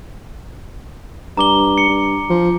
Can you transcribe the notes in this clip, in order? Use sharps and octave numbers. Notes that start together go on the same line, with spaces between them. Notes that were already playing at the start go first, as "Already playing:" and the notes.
G2 A#5 D6 G7
C#7
G2
F3